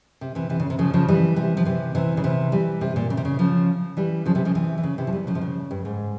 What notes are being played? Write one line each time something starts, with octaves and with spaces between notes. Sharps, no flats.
C3
C3 E3
C3 E3
C#3
C3
C#3 F3
C#3 F3
E3 G3
C3 E3
F3
C3 E3
C3 E3
C#3
C3 E3
E3 G3
C3
A#2
C#3
C3
C#3
C#3 F3
E3 G3
C#3 F3
C3 E3
C#3 F3
C3 E3
E3
C#3
C3 E3
F3
E3 G3
C#3 F3
C3
C#3
G2
G#2